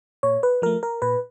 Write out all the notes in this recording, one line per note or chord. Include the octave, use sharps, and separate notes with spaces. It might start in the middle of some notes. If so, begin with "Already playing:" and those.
A#2 C#5
B4
F3 A3 A#4
A#4
A#2 B4